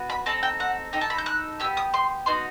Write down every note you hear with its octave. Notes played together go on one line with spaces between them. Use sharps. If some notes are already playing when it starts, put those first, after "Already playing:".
Already playing: B3 F#4
B5
C4 D#4 A4 A5
G5
F#5
D#4 A4 G5
A5
B5
G6
F#6
B3 E4 G4 E6
D#6
C6
B3 D#4 F#4 C6